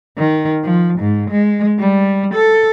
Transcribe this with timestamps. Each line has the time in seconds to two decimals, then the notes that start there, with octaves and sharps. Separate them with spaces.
0.18 D#3
0.64 F3
0.99 G#2
1.31 G#3
1.79 G3
2.34 A4